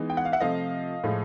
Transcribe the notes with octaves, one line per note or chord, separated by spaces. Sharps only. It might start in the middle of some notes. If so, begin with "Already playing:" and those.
Already playing: E3 G#3 B3 D#4
G5
F#5
F5
E5 F#5
C3 F3 A3 D#5 F5
A2 F3 G#3